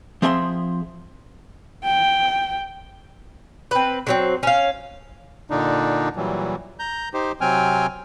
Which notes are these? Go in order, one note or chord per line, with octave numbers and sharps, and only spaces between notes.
F3 C4 G#4 E5 G#5 C6
G5
C4 B4
D3 F#3 C4
C#4 F5
A#2 D3 D4 D#4
A#2 E3 F#3 G3
A#5 G6
D#4 G4 C5
C3 F#3 C4 G5 G#5 F6